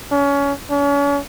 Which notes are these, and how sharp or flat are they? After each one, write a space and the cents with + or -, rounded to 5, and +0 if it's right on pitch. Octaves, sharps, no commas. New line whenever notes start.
C#4 +25
C#4 +40